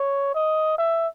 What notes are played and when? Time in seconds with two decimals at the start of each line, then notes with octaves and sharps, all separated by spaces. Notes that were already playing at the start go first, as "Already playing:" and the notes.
Already playing: C#5
0.35 D#5
0.78 E5